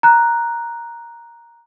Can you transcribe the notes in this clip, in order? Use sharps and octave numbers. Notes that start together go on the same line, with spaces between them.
A#5 F#6